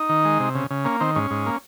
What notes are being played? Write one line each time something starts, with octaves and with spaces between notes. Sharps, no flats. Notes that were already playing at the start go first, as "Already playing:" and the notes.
Already playing: D#4
D#3
G#3
C3
C#3
C#3
A#3 C#4
D#3 C4
G#2 C#4
G#2
A#3